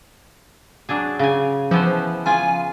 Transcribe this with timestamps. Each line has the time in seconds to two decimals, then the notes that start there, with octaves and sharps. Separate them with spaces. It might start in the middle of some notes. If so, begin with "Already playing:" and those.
0.89 F#3 D4 G#4
1.19 C#3 G#5
1.71 E3 F3 B3 C5
2.26 C#3 F4 G#4 G#5